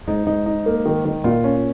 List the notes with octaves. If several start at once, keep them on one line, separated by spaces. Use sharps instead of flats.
G#2 D#4
G#2 D#4
D#4
A#3
D#3
D#3
A#2 F4
C#4